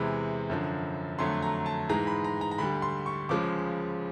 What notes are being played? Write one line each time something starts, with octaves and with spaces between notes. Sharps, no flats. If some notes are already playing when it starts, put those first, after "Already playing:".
Already playing: E2 C3 E3 G#3 B5
F#2 D3 F3
F2 D3 F#3 A3 C6
A#5
A5
G#2 E3 G#3 A#5
B5
A#5
A#5
A#5
D2 D3 G3 B5
C6
C#6
C#2 C#3 F3 G#3 D6